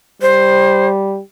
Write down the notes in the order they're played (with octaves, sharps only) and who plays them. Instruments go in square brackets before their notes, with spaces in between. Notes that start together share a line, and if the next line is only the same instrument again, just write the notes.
[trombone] G3 [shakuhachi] C5